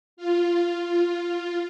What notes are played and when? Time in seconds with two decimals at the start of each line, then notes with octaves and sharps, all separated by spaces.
0.17 F4
0.83 F4